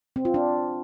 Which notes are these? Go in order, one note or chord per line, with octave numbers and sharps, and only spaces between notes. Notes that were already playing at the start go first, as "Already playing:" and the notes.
C4
F4
D4